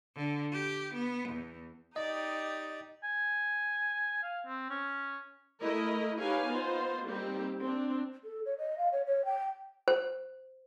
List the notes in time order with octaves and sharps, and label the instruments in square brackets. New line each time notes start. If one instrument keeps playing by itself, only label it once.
[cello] D3
G4
B3
E2
[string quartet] D#4 G4 D5 [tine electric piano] D#5
[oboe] G#5
F5
C4
C#4
[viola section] A3 E4 A#4 D#5
D#4 G4 B4 C#5 F5 G#5
B3 D#4 F4 C5
G3 A#3 C4 D#4 G4
C4 D4
[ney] A4
C#5
D#5
F5
C#5
C#5
G5
[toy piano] C5